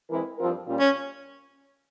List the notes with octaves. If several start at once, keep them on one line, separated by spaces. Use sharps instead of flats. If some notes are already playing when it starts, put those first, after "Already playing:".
E3 G#3 C4 E4 A#4
G2 F3 C4 F4 A#4
A#2 G3 C#4 F4
C#4